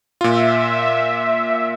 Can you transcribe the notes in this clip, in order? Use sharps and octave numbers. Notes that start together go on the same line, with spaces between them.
A#2 F4 E5